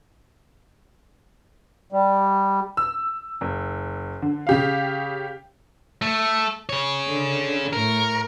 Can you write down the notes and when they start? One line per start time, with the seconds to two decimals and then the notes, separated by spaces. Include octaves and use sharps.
1.92 G3
2.77 E6
3.41 F#1
4.22 D3
4.47 C#3 G4 F5
6.02 A3
6.69 G#4 C#5
7.08 D3
7.73 A2 A#4 C#6